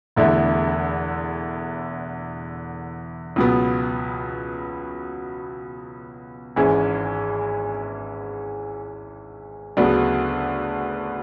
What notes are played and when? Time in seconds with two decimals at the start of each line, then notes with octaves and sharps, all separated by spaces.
0.16 E1 E2 D3 A3 E4
3.36 C#2 B2 F#3 B3
6.56 G#1 G#2 E3 G#3 C#4
9.77 D2 C#3 F#3 B3 D4